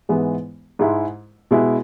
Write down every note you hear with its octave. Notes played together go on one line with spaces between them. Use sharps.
G#2 E3 G#3 B3 E4
G#2 G#3 E4
B2 G#3 E4